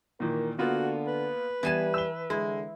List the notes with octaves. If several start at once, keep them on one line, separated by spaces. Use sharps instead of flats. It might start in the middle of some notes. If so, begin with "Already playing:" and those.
A#2 D#3 E3 A#4
D3 A#3 B3 F4 F#4
B4
E3 G3 B3 G#5 A5 D#7
E6 G7
D3 G#3 E4